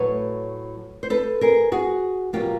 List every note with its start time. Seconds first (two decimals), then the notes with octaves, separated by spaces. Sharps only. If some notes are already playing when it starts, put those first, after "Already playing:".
Already playing: A2 F#3 A3 B4 C#5
1.03 C5
1.10 A4 B4
1.41 G#4 A#4
1.72 F#4 G#4
2.33 B2 F#3 A#3 F4 G4